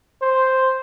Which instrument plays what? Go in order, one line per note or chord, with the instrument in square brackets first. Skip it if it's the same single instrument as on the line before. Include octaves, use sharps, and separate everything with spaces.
[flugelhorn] C5